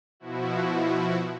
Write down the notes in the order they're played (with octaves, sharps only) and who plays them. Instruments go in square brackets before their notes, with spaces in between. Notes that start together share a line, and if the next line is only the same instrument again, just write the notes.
[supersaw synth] B2 F3 E4 F#4